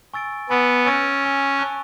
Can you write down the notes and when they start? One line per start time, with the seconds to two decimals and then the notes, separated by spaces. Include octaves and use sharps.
0.13 G#5 C#6 E6 A6 D7
0.50 B3 G#5 C#6 E6 A6 D7
0.86 C#4 G#5 C#6 E6 A6 D7
1.22 G#5 C#6 E6 A6 D7
1.59 A5 C#6 F#6